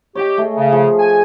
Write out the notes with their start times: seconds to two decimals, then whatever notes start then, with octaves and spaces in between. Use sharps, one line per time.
0.15 G4 C#5 D#5 G5
0.38 A3 G#4
0.56 C#3
0.71 F3 G#4
0.99 G#5